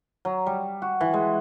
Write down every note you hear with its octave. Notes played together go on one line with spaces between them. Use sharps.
F#3
G3
F#4
E3
G#3